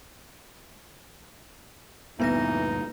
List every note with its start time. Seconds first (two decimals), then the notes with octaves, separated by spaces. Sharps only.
2.20 D2 G2 A#2 E3 B3 D#4 B4 A#6